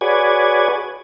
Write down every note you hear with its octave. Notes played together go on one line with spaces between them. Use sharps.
F#4 G#4 B4 C#5 D5 G#5